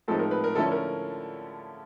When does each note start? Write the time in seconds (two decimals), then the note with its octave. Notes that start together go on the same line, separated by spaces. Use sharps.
0.08 A2 F3 G#3 C4 D#4 A4
0.19 A#4
0.31 B4
0.44 A#4
0.55 D3 F3 A3 C#4 E4 A4
0.72 A#4